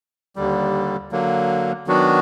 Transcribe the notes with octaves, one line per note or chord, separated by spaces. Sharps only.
D#2 D3 G3
D3 F#3 A#3
D#3 F#3 B3 D4 F#4